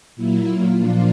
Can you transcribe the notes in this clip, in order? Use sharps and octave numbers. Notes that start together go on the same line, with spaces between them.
A#2 F#3 A#3 E4
F4
A#2 F3 A#3 D4 F4